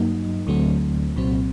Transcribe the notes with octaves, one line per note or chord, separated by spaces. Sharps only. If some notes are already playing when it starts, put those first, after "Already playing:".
Already playing: G2 F#3 A#3 D#4
D2 D3 F#3 A3 C4
C2 A#2 F#3 C4